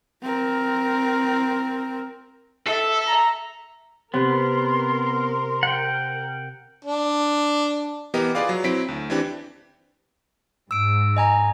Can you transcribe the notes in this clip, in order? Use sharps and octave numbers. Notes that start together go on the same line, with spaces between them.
C4 A#4
A4 E5
A#5
C3 B3 G4 A#4 C6
F#5 G5
D4
E3 B3 G4 A#4 D#5
F4 G#4 B4 D5 F5 D6
F#3
F#3 C4 E4 B6 D7
D2
E3 C4 D4 G4 D5
G#2 E6 D7
D#5 G#5 A#5